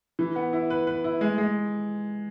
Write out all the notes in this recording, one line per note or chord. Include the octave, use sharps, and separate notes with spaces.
E3
B3
E4
B4
B4
E4
G#3
G#3